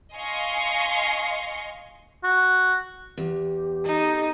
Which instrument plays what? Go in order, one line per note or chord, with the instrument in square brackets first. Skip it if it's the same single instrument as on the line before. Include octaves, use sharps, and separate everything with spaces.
[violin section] D#5 F5 G#5 C6 C#6 C7
[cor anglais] F#4
[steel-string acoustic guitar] E2 [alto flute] G4
[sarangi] D#4 [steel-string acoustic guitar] A4